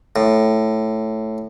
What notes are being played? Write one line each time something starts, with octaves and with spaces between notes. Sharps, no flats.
A2